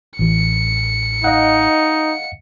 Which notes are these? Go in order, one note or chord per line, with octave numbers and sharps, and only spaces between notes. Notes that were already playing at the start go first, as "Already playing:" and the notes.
A1 E3 C#7
D#4 D#5 F5 F#5